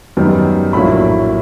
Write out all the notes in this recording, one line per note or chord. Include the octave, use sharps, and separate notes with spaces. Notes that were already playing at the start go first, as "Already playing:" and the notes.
F#2 D#3 G3 B3
A#1 A2 F#3 A#3 B5